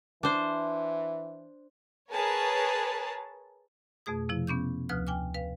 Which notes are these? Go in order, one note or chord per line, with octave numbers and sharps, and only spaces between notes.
E3 D4 C5
G#4 A#4 B4 C#5 A5
F2 B2 A3 G#4 D#6
C3 F3 E4
B3 C#4 D6 G6
D2 F3 B4 D#6 F6 F#6
G5 G#5 D6 F6
B4 F5